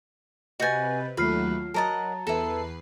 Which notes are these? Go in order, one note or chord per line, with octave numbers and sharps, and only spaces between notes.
C3 F#4 B4 D#5 G#5 G6 A6
D#2 F#3 A3 F4 B4 F6 C7
F#3 A#4 D#5 F#5 A5 A#5 A6
E2 E4 A4 B4 C7